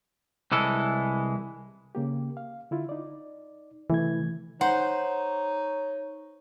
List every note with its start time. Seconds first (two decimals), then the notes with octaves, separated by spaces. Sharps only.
0.52 C2 E3 G#3 A4
1.95 C#3 A#3 G4
2.37 F5
2.71 D3 E4 F4
2.89 D#4 D5
3.90 C3 E3 A3 G#6
4.61 D#4 C5 C#5 F#5